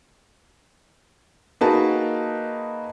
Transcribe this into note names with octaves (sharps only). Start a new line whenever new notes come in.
A#3 D#4 F#4 G#4 B4 A5